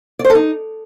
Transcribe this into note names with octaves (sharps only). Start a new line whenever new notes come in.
D5
C5
A4
D#4